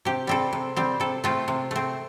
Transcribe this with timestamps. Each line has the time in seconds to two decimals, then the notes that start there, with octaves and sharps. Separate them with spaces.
0.05 C3 G4
0.27 G3 C4 A4
0.53 C3
0.76 G3 C4
1.00 C3 A4
1.24 A3 C4 F4
1.48 C3
1.71 A3 C4